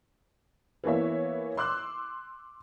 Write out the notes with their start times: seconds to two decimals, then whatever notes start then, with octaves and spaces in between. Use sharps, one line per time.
0.84 E3 A#3 B3 C#5 E5
1.57 C6 D6 E6 F#6